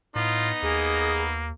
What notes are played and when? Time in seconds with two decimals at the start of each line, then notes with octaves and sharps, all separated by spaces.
0.16 A2 B3 D#4 F4
0.62 D#2 A#3 G#4